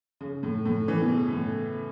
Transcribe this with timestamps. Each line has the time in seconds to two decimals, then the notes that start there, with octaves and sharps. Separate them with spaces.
0.21 C#3
0.43 A2
0.66 A2
0.88 E3
1.01 B2
1.10 C#3
1.33 A2